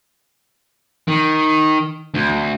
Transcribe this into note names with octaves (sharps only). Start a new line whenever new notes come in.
D#3
D2